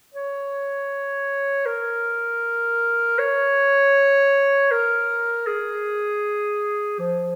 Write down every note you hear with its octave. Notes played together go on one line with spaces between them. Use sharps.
C#5
A#4
C#5
A#4
G#4
F3